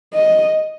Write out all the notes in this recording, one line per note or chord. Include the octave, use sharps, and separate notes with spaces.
D#5